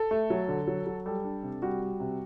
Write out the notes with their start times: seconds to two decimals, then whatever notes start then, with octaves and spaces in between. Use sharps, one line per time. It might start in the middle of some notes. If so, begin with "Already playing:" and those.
Already playing: A4
0.11 A3
0.30 F#3
0.48 D3
0.67 F#3
0.87 F#3
1.06 G3 A4
1.24 D4
1.43 C3
1.62 G3 F#4
1.82 G3
2.00 C3